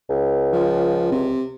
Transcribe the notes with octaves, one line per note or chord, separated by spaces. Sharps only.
C#2
F3
C3